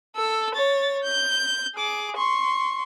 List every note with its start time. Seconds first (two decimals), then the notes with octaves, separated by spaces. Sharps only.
0.16 A4 E6
0.55 C#5 A6
1.03 G6
1.75 G#4 D6
2.17 C6 C#6